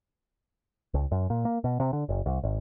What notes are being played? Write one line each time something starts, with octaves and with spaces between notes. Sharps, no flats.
C#2
F#2
A#2
A#3
B2
C3
D3
F#1
C2
G#1